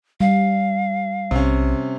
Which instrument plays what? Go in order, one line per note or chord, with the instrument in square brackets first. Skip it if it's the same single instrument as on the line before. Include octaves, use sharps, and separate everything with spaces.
[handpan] G3 [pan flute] F5
[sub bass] B1 [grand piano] C3 C#4